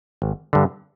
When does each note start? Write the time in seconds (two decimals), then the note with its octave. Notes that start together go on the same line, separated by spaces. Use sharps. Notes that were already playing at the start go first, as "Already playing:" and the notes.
0.22 G#1
0.53 G2 D3